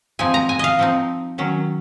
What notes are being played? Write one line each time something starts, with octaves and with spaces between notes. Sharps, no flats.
F3 C4 D#4 G#5
A#5
G#5
D#5 F5
F3 C4 D#4
D#3 F#3 C#4